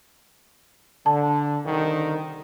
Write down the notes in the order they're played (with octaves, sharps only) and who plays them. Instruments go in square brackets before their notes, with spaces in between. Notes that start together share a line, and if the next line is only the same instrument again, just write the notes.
[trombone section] D3 [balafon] A5
[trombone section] C2 D3 D#3